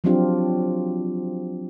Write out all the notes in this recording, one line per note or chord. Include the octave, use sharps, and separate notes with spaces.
F3 F#3 C4 D4 F4 G4